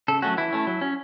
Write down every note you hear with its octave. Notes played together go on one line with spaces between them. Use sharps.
C#3 A4
F#3 A3 C#4 F#4
E3 E4
A3 C#4
F#3
C#4